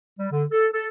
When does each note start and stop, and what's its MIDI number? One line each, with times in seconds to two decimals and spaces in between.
0.19 0.27 55
0.31 0.44 50
0.51 0.67 69
0.73 0.88 69